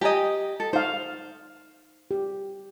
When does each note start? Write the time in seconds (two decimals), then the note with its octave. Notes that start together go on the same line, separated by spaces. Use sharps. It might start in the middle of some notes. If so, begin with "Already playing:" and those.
0.01 G4 D#5 G5 G#5 A#5
0.60 A4
0.73 D#4 C5 F5
2.11 G4